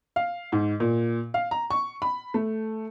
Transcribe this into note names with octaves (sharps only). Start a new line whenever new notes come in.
F5
G#2
A#2
F5
A#5
C#6
B5
A3